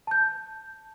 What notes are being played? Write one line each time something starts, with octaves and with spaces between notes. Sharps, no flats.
A5 G6